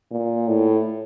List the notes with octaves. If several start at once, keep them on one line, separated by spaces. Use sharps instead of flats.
A#2
A2